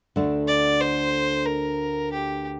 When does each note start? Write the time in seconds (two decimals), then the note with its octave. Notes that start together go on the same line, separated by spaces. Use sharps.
0.16 D2 D3 A3 D4
0.48 D5
0.81 C5
1.46 A#4
2.13 G4